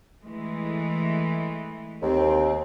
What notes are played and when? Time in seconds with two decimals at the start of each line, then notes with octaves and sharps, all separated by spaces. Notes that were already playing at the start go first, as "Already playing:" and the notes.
0.22 E3 G#3 A3
2.02 D#2 C4